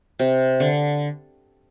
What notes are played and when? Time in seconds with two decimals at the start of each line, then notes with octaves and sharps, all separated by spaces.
0.19 C3
0.60 D3